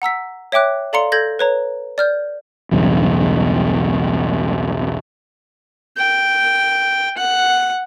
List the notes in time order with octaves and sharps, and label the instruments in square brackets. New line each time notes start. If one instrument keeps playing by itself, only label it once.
[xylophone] F#5 A#5 E6 B6
C#5 E5 G5 D6 F#6
A4 D5 F5 A#5 C6 C#7
A4 G6 G#6 A#6
B4 C#5 A#5
D5 F6 G6
[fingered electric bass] B1 E2 G2 C#3
[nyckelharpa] G5
F#5